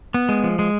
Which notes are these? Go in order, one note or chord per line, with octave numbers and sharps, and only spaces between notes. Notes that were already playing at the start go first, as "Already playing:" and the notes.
B3
G#3
F3
G#3